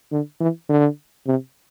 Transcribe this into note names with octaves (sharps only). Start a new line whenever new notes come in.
D3
E3
D3
C3